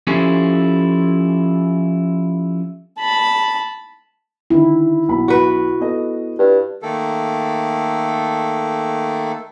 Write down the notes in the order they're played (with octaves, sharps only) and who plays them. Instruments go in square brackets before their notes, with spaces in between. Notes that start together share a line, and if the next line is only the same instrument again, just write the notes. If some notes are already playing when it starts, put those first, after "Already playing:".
[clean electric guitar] F3 C#4 E4 G4 A4 C5
[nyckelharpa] A5 B5
[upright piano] D3 D#3 [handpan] E4
[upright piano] B1 B5
[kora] F#4 B4
[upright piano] B3 A4 D#5
[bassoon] G2
[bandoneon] D#3 A3 A#3 A4